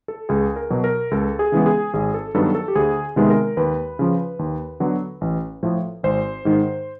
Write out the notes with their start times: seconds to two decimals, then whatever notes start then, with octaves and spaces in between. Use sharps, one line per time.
0.08 A4
0.29 C#2 G#4
0.56 A#4
0.70 B2 F#3
0.84 A#4
1.11 C#2 A4
1.39 G#4
1.52 C#3 E3 G#3 B3
1.66 G#4
1.94 G#1 G#4
2.14 A4
2.34 G2 D#3 F#3 B3 A4
2.55 A4
2.68 G4
2.75 D2 G#4
3.16 C3 D#3 G#3 B3
3.30 A#4
3.57 D#2 B4
3.99 C#3 F3
4.39 D#2
4.80 D3 F#3 B3
5.21 A1
5.63 A2 F3
6.03 G#1 C5
6.45 G#2 D#3